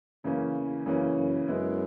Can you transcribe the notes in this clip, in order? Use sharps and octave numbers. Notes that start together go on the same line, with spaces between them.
F#2 C#3 E3 A#3 C#4
E2
F#2 C#3 E3 A#3 C#4
F#2
F#2 G#3 B3 E4